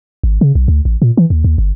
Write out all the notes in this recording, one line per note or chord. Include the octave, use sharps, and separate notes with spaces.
G#1
C#3
B1
D2
A1
A#2
E3
D#2
D#2
G1